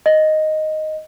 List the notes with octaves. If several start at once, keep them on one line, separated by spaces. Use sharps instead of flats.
D#5